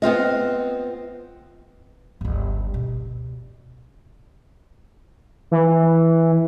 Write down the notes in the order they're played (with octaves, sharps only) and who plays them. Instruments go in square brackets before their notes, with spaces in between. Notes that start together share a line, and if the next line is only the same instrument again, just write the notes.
[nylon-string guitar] B3 C4 F4 D#5
[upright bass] G1 C#2
B2
[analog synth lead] E3